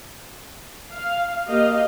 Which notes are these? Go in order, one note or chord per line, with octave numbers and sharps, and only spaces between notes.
F5
A#3 G4 D#5 F5